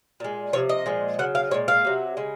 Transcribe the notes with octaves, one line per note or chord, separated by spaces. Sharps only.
A#2 G#3
C3 F3 C#5
D#5
A#2 F3 G#3
C#3 F#3 F#5
F5
A#2 F3 G#3 C#5
F5
C3 F#3
C#3 G#3